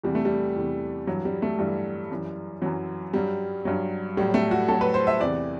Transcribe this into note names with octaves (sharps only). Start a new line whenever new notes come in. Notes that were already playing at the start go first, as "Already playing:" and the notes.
E2 C3 E3 G3
A3
G3
E2 C3 E3
G2 E3 F#3
G3
A3
G2 E3 G3
F#2 E3
F#2 E3 F#3
G2 F#3 G3
G2 F#3
A2 F#3 G3
A3
F#4
A2 F#3 A4
B4
C5
E5
E2 C3 E3 D5